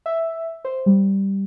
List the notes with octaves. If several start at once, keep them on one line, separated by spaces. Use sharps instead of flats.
E5
C5
G3